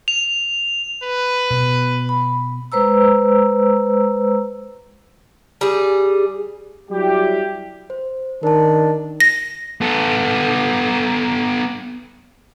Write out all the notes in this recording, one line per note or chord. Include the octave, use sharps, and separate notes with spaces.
F7
B4
B2
B5
G#3 B4 C5 A#5 E6
G3 G#4
F#3 G3 E4 G4
C5
D#3 D4 A#4 A5
A#6
B3 A4